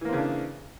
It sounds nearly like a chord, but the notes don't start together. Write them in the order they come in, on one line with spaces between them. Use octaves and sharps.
E3 A#3 C4 C#3 D4